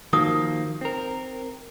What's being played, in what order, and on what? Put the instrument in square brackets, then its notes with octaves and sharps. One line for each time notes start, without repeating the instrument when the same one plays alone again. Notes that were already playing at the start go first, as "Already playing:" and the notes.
[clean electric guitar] D#3 F3 A#3 [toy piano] D#4 F#4 D#6
[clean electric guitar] C4 A#4